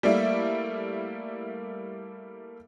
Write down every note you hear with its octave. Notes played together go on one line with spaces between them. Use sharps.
G3 A3 A#3 E4